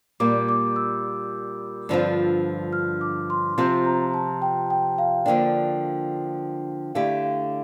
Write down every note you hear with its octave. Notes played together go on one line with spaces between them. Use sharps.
A#2 G3 A#3 D6
D6
E6
G2 D3 F3 C4 F4
F6
D6
C6
C3 F3 C4 F4 C6
A#5
A5
G5
G5
F5
D3 F3 A#3 D4 G5
D3 A3 E4 G4 F5
F5